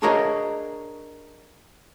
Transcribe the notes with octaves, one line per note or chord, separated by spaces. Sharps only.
D4 F#4 G#4 A#4 C#5 D#5